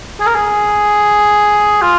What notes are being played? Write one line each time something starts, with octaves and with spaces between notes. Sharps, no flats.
G#4
A#4
G#4
F4